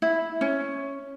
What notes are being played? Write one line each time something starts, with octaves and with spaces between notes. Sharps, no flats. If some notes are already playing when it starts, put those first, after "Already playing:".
E4
C#4